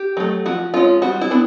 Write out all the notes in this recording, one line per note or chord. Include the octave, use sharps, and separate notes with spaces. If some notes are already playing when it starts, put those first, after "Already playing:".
Already playing: G4
F#3 A3
F3 F#4
G#3 C#4 F4
G3 F#4
E4
B3 D4